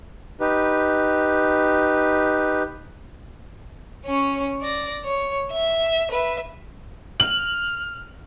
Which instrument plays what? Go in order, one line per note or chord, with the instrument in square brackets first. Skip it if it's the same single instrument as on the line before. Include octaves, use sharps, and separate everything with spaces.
[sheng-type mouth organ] D#4 G4 B4
[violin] C#4 C#5
D5 A#6
C#5
E5
B4 E5
[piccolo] F6 [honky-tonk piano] F#7